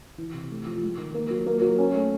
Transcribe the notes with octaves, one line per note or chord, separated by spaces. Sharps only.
E3
C3
A3
F3
G#3
D#3
A#3
F#3
A#3
F#3
C#4
A3